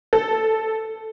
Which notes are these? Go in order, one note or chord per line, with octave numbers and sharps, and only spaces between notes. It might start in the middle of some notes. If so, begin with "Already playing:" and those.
A4